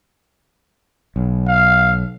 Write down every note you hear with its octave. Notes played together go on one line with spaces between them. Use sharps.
B1
F5